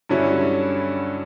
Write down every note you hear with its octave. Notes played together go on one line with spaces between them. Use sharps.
G2 D3 F#3 C#4 E4